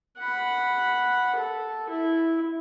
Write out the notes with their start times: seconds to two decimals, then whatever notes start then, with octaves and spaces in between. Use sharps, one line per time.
0.18 F#5 B5
1.36 A4
1.90 E4